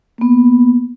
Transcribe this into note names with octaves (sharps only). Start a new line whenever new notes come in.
A#3 B3